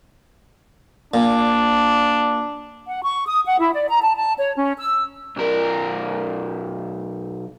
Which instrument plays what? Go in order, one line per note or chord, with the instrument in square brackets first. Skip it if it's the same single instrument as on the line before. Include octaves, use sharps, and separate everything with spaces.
[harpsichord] A#2 [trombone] D4
[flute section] F#5
C#6
D#6
F#5
E4
D5
A#5
A5
A5
C#5
C#4
E6
[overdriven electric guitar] B1 A#4